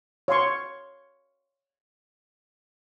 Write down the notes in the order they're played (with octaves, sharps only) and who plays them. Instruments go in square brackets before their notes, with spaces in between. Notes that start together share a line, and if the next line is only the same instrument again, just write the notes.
[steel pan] C#5 F5 C6 C#6